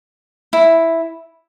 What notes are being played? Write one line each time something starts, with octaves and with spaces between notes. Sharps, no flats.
E4